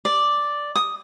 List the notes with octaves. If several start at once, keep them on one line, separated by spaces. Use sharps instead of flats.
D5
D#6